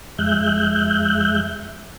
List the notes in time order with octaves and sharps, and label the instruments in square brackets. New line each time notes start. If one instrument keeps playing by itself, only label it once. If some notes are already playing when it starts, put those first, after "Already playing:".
[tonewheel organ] F2 G#3 E5 F#6 G6